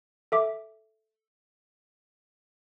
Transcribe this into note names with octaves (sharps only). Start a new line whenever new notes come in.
A4 E5 D6